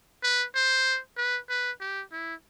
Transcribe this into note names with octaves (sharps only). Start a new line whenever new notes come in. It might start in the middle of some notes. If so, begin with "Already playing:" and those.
B4
C5
B4
B4
G4
E4